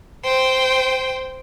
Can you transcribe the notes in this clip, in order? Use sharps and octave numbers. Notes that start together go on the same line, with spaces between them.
C5 G5